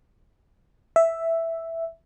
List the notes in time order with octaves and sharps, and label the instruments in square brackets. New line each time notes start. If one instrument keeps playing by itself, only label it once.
[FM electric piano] E5